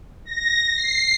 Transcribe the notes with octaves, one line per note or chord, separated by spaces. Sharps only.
A#6
C7